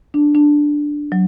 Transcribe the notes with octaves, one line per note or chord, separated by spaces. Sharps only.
D4
D4
F#3